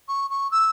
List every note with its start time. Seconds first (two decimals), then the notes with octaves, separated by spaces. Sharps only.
0.08 C#6
0.31 C#6
0.51 E6